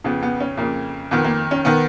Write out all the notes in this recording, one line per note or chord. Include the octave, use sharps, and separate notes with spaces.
F2 C#3 B3
B3
C#4
F2 C#3 A#3
F2 D#3 B3
A#3
C#4
D#3 B3